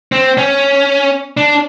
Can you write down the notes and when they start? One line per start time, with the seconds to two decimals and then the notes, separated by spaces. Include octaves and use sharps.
0.12 C4
0.38 C#4
1.37 D4